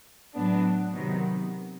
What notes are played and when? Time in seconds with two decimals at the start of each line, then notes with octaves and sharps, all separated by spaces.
0.35 A2 F#3 B3 D4
0.92 C3 D#3 F#3 B3